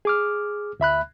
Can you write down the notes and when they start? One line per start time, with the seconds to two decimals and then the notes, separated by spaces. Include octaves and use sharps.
0.05 G#4 D6 F6
0.80 D2 E5 B5 F#6